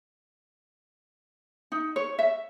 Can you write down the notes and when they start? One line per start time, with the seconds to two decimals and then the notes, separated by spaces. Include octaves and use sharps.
1.72 D#4
1.96 C#5
2.19 E5